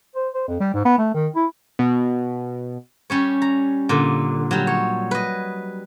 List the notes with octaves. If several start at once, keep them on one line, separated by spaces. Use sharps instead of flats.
C5
C5
F2
G3
G#2
B3
A3
D#3
E4
B2
G3 C#4 C#5
A#5
A#2 D3
F#3 G3
C#5
B4 D#5